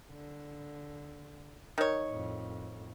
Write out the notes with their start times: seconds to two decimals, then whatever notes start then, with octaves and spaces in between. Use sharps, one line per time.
0.11 D3
1.78 D#3 C#5
2.08 F2 A2